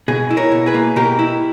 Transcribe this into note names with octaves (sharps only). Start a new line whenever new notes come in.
B2 G#4
E4
A#4 C#5
B2
G#4 B4
A#3
B2 G4 A#4
E4